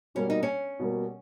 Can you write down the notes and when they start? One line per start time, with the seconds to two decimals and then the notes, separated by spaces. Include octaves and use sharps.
0.15 B2 G3 A#3 C#4
0.30 D#4
0.43 C#4
0.79 B2 G3 A#3